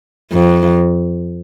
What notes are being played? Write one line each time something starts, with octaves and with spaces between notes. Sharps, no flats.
F2